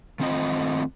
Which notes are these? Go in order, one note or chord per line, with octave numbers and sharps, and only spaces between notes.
D#3 A3 C4 F4 D#5